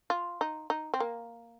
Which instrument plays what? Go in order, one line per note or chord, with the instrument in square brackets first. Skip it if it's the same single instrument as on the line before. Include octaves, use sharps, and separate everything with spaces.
[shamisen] F4
D#4
D#4
C4
A#3